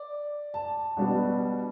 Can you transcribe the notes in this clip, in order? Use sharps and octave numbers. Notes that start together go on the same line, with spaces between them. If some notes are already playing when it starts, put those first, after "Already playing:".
Already playing: D5
A5
B2 G3 B3 D4